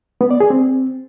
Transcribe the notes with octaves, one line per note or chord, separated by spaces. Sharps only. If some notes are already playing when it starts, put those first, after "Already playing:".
B3
D5
G#4
C4